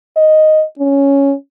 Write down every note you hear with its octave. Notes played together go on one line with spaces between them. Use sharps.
D#5
C#4